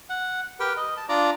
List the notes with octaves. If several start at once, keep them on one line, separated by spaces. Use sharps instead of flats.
F#5
G4 A#4 B4 G5
D#5
A5
D4 F4 D5 A#5